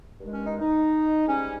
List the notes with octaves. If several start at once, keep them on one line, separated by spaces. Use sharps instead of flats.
G2 D#3 G#3
C#4
D#4
D#4
G#2 G3 C#4